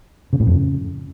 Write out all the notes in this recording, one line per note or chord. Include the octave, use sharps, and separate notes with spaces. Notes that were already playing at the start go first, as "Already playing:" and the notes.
C#3
A2
F2
C#3